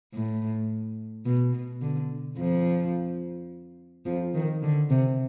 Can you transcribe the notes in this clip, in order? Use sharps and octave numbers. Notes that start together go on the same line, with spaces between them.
A2
B2
B2
D3
F2 F3
F2 F3
D#3
D3
C3